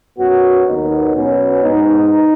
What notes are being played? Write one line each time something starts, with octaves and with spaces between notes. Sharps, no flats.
F#2 F#3 B3 F#4
D#2 D#3 F#3 B3 D#4
B2 F#3 B3 C#4
G#2 G#3 B3 D#4